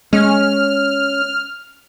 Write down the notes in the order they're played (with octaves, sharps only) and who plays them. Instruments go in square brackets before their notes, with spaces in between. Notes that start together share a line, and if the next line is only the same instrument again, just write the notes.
[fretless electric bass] G#3 [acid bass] C#4 [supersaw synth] F6